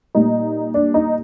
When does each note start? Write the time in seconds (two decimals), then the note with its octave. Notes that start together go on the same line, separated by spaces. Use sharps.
0.15 A#2 G3 D#4
0.74 D4
0.94 D#4